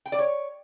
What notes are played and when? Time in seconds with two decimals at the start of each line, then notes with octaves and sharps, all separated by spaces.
0.06 G5
0.12 D5
0.19 C#5